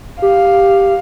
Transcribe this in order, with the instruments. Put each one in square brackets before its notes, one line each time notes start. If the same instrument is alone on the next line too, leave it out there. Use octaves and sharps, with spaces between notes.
[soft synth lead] G4 [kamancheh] F5